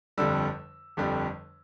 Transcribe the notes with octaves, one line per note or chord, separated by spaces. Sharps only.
G1 F2 D3 G3 E6
G1 F2 D3 G3